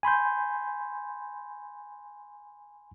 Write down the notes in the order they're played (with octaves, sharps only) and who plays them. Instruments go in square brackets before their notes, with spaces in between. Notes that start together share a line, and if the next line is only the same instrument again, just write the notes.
[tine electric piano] G#5 B5 C6 G6